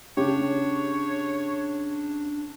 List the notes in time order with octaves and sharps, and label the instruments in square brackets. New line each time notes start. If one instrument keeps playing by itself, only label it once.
[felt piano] C#3 G4 [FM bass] D4 [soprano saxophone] C#5